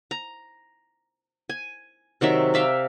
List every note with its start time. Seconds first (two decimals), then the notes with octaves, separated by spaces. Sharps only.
0.11 A#5
1.49 G#5
2.21 C3 D#3 F#3 E5
2.54 D5 E5 F5 G5